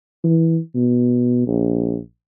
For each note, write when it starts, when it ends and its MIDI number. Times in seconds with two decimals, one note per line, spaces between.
0.24 0.58 52
0.75 1.46 47
1.47 1.97 34